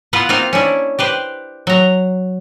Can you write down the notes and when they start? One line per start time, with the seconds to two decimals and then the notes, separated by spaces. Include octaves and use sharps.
0.13 B3 E4 F4 B4 F#5
0.29 A#3 C4 D#4 F4 F5
0.53 C#4 D4 E4
0.99 G4 B4 C5
1.67 F#3 A#5